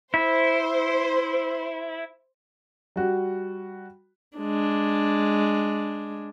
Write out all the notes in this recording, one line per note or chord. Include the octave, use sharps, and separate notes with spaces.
E4 C5
G3 F#4
G#3 D4